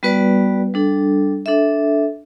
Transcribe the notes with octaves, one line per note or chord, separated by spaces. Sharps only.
G3 B3 F#4 B4 D5
G3 D4 A4
D4 A4 E5